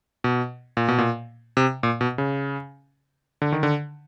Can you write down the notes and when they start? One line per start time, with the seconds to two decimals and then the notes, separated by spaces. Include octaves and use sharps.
0.24 B2
0.77 A#2
0.88 B2
0.98 A#2
1.57 C3
1.83 A#2
2.01 B2
2.18 C#3
3.42 D3
3.52 D#3
3.63 D3